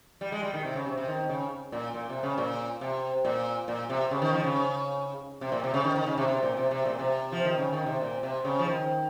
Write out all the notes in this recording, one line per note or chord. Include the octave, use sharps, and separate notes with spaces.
G3
G#3
G3
D#3
C3
C#3
C3
C3
D#3
C#3
A#2
A#2
C3
C#3
A#2
C3
A#2
A#2
C3
C#3
D#3
F3
C#3
C3
A#2
C3
C#3
D#3
D#3
C#3
C3
C3
A#2
C3
C3
A#2
C3
F3
D#3
C#3
D#3
C3
A#2
C3
C#3
F3
D#3